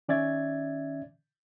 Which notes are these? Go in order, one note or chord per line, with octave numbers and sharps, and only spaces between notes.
D#3 C#4 D5 E5 G#6 A6